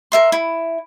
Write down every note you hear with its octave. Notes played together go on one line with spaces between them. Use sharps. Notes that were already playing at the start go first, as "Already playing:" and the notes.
A#4 E5 C6
E4